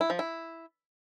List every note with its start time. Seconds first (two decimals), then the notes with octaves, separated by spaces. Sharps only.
0.01 E4
0.10 F3
0.19 E4